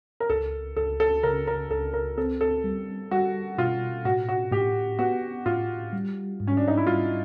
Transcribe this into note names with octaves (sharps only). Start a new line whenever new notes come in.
A#4
C#2 A4
C#2 A4
A4
C#3 A#4
A#4
C#2 A4
A#4
C4 A4
A4
G3
G3 F#4
B2 F4
A2 F#4
F#4
A2 G4
B3 F#4
A2 F4
G3
G#2
C#4
D4
D#4
E4
G3 F4